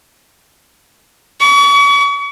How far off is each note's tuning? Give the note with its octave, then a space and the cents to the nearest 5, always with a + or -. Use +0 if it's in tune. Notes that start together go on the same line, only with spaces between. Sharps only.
C#6 +40